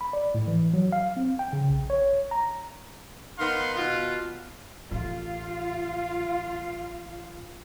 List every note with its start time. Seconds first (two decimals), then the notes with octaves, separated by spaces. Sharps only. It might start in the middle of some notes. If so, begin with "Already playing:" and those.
0.01 B5
0.13 D5
0.35 A2
0.48 E3
0.74 F#3
0.92 F5
1.17 C4
1.39 G5
1.53 C#3
1.70 A#1
1.90 C#5
2.31 A#5
3.39 D#3 B3 A#4 F5 C6
3.75 B2 F4
4.91 A1 F4 F5